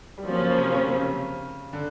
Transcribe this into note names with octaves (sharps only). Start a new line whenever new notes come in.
G3
F3 F#3 A#3 C#4
C#3
C3
C#3
C3
C#3
D3